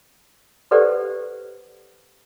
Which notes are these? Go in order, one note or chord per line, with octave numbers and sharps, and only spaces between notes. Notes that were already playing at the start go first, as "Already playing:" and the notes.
G4 A4 B4 C5 D5 F#5